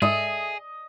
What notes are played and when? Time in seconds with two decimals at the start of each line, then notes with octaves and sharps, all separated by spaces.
0.02 G#2 G#4 A4 D#5 E5